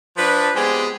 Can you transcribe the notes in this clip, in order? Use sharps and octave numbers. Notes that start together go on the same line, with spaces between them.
F3 D4 B4
G#3 B3 C4 G4 G#4